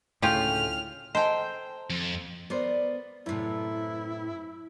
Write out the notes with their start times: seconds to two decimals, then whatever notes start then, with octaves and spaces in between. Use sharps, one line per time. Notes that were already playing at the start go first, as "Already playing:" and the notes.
0.22 D2 A2 C#3 C#4 F4 G5 F6
1.15 A4 C5 D#5 G5 G#5 A#5
1.90 F2
2.50 B3 A#4 C5 D5
3.26 F#2 A2 C3 B3 E4